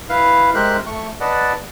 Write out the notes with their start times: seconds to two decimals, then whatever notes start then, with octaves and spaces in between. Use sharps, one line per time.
0.09 E4 B4 F5
0.55 G#3 G4 A#4 C5 E5 F#6
0.86 A3 C#6
1.20 B4 D5 D#5 F#5 A5